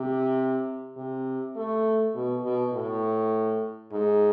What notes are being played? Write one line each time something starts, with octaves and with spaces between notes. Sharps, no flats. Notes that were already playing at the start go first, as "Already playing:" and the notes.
Already playing: C3
C3
A3
B2
B2
A2
G#2